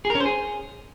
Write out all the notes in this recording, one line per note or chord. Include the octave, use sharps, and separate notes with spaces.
G#4
A#4
C#4
C5
G#4